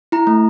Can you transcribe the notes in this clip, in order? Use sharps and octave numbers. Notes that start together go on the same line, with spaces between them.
E4 A#5
A3